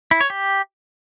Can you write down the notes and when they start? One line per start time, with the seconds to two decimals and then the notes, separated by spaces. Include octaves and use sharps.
0.11 E4
0.21 C#5
0.30 G4